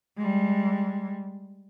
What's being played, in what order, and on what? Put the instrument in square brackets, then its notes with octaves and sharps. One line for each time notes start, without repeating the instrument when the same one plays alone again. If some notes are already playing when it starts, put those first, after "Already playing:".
[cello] G3 G#3